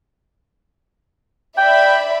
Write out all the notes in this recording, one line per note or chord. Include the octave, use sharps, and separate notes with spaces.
D5 E5 G5 B5